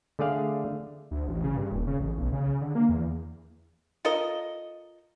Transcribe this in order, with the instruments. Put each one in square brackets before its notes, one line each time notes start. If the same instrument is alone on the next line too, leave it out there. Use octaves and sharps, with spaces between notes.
[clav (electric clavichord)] D3 A3 G#4 D5 F5
[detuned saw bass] D2
A1
C#3
G2
D#1
C#3
A1
B1
C#3
D3
A#3
E2
[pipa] F4 A4 A#4 D#5